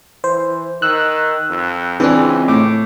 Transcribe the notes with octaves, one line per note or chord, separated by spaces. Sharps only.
E3 C5
D#3 E6 F#6
F2
C#2 E3 C4 D4 G#4
A2 D6